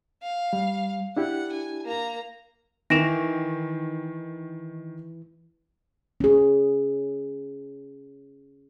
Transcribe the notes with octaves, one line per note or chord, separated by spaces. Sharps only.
F5
G3
D4 E4 G4 F#5
G#5
A#3 A#5
D#3 E3 A#6 D7 E7 F7
C#4 G#4